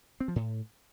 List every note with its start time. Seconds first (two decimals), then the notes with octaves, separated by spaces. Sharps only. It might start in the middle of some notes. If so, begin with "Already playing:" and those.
0.20 C4
0.28 F3
0.36 A2